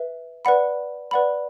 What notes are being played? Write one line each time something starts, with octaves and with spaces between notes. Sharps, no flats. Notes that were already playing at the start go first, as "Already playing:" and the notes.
Already playing: B4 E5
B4 D5 F#5 B5
B4 D5 F#5 B5